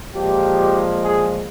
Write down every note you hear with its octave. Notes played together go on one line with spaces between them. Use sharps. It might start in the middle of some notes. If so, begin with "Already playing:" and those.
A#2 F3 G#3 G4
G#4